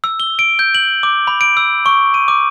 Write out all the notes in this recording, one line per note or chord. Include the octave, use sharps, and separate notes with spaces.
E6
G7
D7
G6
F#7
D6
B5
D7
E6
C#6
D#7
D6